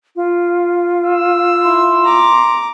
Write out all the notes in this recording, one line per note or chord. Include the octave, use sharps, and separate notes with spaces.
F4
E6
E4 C6
A#5 D6